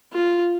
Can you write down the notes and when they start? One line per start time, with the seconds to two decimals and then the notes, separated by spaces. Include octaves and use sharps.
0.13 F4